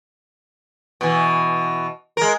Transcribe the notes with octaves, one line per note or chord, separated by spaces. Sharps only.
B2 E3
G#3 A#4